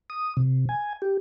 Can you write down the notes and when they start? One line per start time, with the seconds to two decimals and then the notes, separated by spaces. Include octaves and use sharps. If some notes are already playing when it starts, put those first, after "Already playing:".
0.10 D#6
0.37 C3
0.69 G#5
1.02 G4